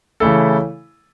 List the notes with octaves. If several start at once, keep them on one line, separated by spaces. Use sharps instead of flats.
C#3 E3 A3 E4 A4